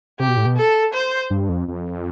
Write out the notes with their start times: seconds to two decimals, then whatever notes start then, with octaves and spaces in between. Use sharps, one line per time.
0.20 C3 G4
0.28 B2
0.37 A2
0.46 B2
0.57 A4
0.93 C5
1.30 G2
1.49 F2
1.68 F2